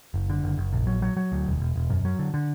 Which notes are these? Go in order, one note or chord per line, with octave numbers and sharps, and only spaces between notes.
F#1
D3
F#1
F#1
A#1
F#3
F#3
F#3
D2
E1
E1
E1
F#2
F#3
D3
D3